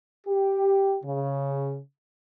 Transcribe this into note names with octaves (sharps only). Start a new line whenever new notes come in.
G4
C#3